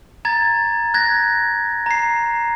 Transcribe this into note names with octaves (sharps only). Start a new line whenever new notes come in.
A#5 G#6 A6
F#6 G#6 A#6
A#5 C7